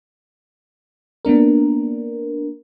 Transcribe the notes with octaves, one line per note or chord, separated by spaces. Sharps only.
A#3 B3 D4 A#4